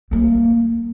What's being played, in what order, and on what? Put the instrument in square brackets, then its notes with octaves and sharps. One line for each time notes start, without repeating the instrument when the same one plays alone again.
[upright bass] G3 A#3